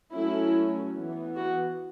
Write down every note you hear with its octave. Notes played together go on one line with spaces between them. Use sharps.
F#3 A3 C#4 E4
E3 B3
F#4